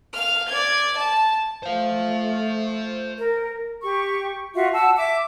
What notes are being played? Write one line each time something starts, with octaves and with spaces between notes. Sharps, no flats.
F5 F6
D5 G#6
A5
A3 C5 F5
A#4
G4 C#6
F4 F#4 E5 C#6
F#5 A5 E6
E5 D6